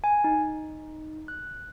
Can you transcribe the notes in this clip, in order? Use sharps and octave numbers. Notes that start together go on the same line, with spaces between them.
G#5
D#4
F#6